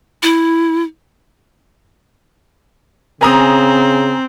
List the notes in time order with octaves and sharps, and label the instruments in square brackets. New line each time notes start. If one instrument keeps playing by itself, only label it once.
[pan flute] E4
[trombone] C#3 [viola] C4 [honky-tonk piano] G#5 A#5 D#6